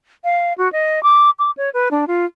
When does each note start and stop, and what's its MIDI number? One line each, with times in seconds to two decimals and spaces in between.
0.24 0.53 77
0.58 0.71 66
0.72 1.02 75
1.03 1.30 86
1.39 1.51 86
1.57 1.70 73
1.74 1.89 71
1.91 2.05 62
2.08 2.25 65